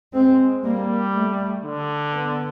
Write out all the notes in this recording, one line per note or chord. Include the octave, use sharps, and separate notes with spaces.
G#3 C4
G3 A#3
A3
D3
B3